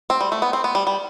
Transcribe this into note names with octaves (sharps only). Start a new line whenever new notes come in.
C4
G3
A3
B3
C4
B3
G3
G3